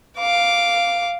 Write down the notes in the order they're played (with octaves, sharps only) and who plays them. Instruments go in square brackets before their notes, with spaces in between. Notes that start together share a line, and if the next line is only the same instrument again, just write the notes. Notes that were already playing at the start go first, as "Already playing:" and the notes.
[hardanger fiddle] F5 D6